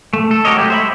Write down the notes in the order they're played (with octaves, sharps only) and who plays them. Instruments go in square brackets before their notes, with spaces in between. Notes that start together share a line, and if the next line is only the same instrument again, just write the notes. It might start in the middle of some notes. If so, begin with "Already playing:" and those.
[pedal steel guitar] A3
A4
F#4 G4 A#4 C#5 D#5
F#3 G#3 A3 G4
C5 E5 B5